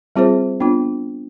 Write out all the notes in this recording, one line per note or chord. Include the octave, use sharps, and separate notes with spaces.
G3 C4 F4 G#4 C5
B3 D4 F4